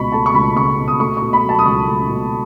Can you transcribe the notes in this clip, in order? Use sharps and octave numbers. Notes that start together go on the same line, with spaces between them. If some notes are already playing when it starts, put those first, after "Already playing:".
Already playing: C#2 B2 B5 C#6
A3 A5
C#6
C#2 B5
C#2 C#6
B2
D#6
A3 C#6
B2 C#6
B5
F#3
A5
D#6
C#2 C#6
A3
B2